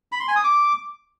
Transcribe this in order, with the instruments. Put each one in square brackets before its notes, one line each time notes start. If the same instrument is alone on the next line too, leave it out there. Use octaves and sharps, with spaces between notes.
[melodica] B5
C6
G#5
D#6
D6